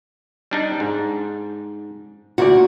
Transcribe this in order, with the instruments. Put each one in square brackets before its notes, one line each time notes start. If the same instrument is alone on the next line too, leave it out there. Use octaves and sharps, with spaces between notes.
[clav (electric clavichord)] G3 D4 D#4
G#2
[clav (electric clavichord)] D2 A#2 D5 [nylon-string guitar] F#4